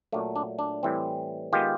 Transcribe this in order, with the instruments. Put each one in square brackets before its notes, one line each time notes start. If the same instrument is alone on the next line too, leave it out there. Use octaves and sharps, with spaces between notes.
[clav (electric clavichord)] A#2 F#3 A3 D4
D4
D4
A2 E3 G3 C4
D#3 G#3 B3 F4 G4